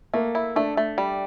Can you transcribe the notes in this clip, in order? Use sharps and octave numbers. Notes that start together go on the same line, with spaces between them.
A3 A#3
E4
A3 D4
A3
G3